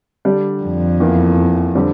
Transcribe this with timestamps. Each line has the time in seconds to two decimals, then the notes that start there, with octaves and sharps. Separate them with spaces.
0.25 D3 G3 D4 G4
0.62 F2
1.00 E2 E3 A#3
1.75 D3 G3 C4 G4